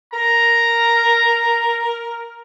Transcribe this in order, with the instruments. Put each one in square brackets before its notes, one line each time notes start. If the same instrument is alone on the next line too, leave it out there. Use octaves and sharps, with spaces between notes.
[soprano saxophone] A#4 [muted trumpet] A#5